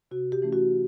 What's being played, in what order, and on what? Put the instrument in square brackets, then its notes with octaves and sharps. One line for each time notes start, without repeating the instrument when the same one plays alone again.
[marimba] C3 F#4
G4
E3 A3 C#4 E4
F#4